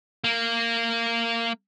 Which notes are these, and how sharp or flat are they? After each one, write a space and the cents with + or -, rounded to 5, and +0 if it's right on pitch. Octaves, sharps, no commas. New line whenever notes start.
A#3 -15